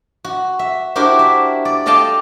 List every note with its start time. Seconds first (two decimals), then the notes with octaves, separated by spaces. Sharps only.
0.24 F#4
0.59 E5
0.95 D4 E4 F#4 G4 A#4 C5
1.19 E5
1.65 D5
1.86 A4 D5 D#5 F5 G5 A5